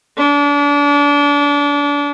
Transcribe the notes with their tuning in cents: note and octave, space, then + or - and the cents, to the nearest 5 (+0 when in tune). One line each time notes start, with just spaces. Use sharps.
D4 -30